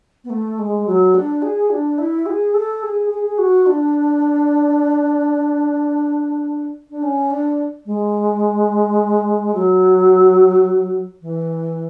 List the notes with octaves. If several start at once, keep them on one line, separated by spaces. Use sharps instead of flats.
B3
A3
G#3
F#3
D4
G#4
D4
E4
G#4
A4
G#4
G#4
G#4
F#4
D4
D4
C#4
D4
G#3
F#3
E3